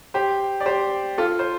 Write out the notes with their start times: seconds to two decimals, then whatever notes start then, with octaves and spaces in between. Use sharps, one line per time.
0.14 G4 C5
0.60 D5
0.66 G4 C5
1.18 F4 A4
1.39 C5